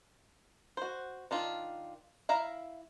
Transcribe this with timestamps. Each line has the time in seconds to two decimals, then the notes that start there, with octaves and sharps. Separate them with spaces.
0.77 F#4 C5
1.31 D#3 D4 F4
2.29 E4 E5 F5 A#5